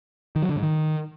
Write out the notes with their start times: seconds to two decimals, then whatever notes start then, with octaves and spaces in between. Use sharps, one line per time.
0.36 D#3
0.42 F#3
0.49 D3
0.56 G#2
0.63 D#3